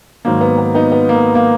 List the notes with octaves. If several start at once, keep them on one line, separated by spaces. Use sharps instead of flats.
G#2 D#3 F#3 A#3
B3
B3
B3 D#4
B3
A#3
A#3